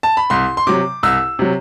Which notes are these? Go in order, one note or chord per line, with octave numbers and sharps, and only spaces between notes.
A5
B5
C2 C6
C6
C3 F#3 D6
C2 E6
C3 F#3